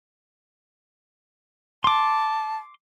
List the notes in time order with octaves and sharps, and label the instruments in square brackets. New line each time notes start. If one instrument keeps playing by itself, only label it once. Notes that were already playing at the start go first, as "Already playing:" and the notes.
[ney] A5 [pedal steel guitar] C6 D6